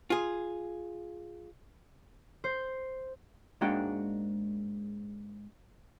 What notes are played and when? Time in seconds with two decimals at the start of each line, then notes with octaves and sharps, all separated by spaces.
0.10 F4 G#4
2.44 C5
3.61 G#2 G#3 A#3 D4 F#4 G5